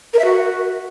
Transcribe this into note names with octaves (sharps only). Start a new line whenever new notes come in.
A#4
E5
F#4